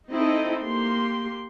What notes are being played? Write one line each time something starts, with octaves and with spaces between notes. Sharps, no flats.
C4 D#4 E4 A4 D#5
A#3 G4 C6